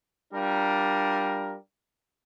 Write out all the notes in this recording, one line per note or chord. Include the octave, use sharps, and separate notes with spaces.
G3 D4 F4 A#4